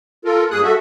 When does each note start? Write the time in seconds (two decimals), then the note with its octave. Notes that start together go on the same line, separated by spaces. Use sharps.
0.25 F4 A4 A#4
0.51 G2 A#3 G#4 D#6 F#6
0.63 F#4 A4 E5